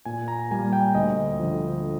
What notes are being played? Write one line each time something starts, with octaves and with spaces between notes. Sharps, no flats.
A#2 G#5
A#5
G3 A#3 G#5
G5
D2 D#5
D3 F3